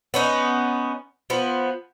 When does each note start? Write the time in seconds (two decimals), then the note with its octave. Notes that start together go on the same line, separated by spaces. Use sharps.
0.14 B3 C#4 D#4
1.30 F3 B3